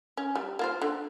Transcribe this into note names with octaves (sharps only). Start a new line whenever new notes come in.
C#4
G3
A#3 F4 C5
D3